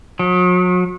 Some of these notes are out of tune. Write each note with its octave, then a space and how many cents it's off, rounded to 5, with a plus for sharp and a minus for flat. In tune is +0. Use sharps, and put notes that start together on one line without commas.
F#3 -40